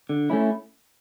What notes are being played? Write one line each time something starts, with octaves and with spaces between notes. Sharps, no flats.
D3
A3 C#4 E4